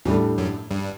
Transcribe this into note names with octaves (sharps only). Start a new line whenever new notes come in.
E2 A2 E3 G3 D4 A4
F#2 F#3
G2 G3